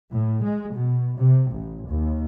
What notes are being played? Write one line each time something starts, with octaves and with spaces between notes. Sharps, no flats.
A2
G#3
B2
C3
A1
D#2